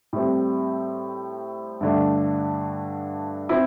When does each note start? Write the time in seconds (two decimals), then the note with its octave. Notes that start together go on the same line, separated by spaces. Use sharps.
0.13 A2 G3 C4
1.81 G2 D3 A3 D4
3.49 C4 E4